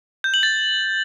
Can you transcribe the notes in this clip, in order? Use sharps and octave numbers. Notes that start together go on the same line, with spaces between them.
G6
F#7
A6